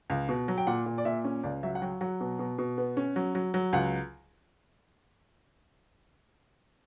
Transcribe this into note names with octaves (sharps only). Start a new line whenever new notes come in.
C#2
B2
F#3
G5
A#2 F#5
A#2
D5
A#2 E5
C#4
C#2 D5
F#3 E5
F#5
F#3 G5
F#3 F#5
B2
B2
B2
B3
C#4
F#3
F#3
F#3
C#2 F#5